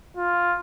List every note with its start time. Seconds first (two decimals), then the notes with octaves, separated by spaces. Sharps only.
0.17 F4